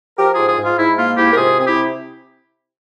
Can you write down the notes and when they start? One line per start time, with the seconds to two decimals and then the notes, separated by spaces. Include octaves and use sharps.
0.19 F3 G4 A#4
0.34 G#2 F4 G#4
0.48 F4 G#4
0.58 G#2
0.63 F4
0.78 G#2 E4
0.97 A#3 F4
1.17 G#2 E4 G4
1.32 A#4
1.37 C3 F4 G#4
1.57 C4 G#4
1.66 E4 G4
1.76 C3